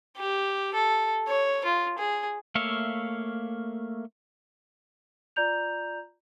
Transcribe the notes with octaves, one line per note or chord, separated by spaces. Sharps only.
G4
A4
C#5
F4
G#4
A3 A#3 C#5 E5 F5
F4 D5 A#5 G6 F7